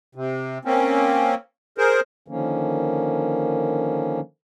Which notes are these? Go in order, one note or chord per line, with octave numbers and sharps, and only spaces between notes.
C3
A#3 C4 C#4
G#4 A#4 C5
D3 D#3 F3 A#3 C#4